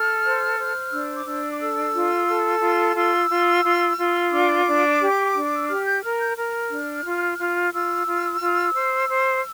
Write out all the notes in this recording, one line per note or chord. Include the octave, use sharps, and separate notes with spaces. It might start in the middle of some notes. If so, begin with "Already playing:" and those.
Already playing: A4 F6
C5
C5
D4 E6
D6
D4 E6
D6
A4 E6
F4
A4
F4
F4 E6
F4
F4
F4
D4 D6
D4
G4
D4
E6
G4 F6
G6
A#4 F6
G6
A#4 F6
D4
F4
F4
F6
F4 E6
F4
F4
C5
C5